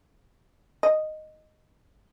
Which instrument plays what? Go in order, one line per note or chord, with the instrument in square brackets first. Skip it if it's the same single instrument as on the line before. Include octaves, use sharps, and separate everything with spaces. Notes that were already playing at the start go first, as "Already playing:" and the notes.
[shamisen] D#5